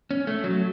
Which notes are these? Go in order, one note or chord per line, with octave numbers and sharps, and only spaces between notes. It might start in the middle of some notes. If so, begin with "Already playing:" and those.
C#4
A3
F#3